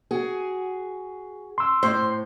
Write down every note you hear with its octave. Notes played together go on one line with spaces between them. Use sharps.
F#4 G#4
C6 E6
A2 C5